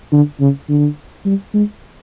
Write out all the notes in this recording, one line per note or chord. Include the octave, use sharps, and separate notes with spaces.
D3
C#3
D3
G3
G#3